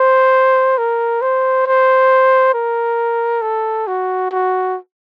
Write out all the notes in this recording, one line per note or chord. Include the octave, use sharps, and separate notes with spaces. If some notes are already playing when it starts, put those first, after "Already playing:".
Already playing: C5
A#4
C5
C5
A#4
A4
F#4
F#4